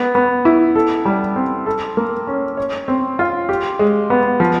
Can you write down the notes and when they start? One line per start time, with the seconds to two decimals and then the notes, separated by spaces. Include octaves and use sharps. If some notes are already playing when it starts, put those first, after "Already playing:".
Already playing: B3
0.15 B3
0.45 E4
0.75 A4
1.05 G3
1.36 C4
1.66 A4
1.97 A#3
2.27 C#4
2.57 C#5
2.88 C4
3.19 F4
3.49 G4
3.79 G#3
4.10 B3
4.40 F3